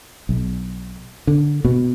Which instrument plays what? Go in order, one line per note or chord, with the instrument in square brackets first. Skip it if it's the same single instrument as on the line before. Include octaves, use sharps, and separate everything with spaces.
[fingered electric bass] B1
D3
B2